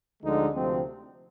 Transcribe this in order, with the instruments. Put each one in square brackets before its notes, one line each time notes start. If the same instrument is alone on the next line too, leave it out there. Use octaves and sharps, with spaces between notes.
[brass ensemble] D2 D3 F3 G#3 D#4
D2 C3 F3 C4